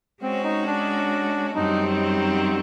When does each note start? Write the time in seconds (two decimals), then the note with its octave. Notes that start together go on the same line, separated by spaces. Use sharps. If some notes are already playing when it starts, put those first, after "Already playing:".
0.21 G#3 C4 C#4 F#4
0.44 D#4
0.67 D4
1.55 F#2 D#3 G3 C4 D#4